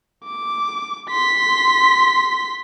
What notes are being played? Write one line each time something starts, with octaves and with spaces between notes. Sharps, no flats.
D6
C6 B6